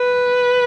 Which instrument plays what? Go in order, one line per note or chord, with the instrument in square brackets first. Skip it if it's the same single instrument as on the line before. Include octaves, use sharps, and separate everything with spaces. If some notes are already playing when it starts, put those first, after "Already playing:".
Already playing: [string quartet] B4